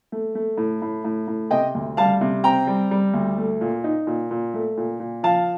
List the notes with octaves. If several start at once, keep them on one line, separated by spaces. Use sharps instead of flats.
A3
A3
A2
A2
A2
A2
C3 D#5 G5
D2
G3 F5 A5
C3
C4 G5 A#5
G3
G3
D2
A3
A#2
D#4
A#2
A#2
A3
A#2
A#2
F3 F5 A5